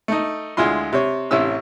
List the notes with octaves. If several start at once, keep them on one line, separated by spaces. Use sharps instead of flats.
A3 D#4
D2 G#3 E4 F4 C6
C3 C#5
A1 C3 C#4 E4 E6